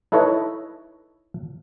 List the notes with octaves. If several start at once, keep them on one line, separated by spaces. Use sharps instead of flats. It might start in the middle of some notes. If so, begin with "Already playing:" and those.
D#4 E4 A4 B4 C#5 D#5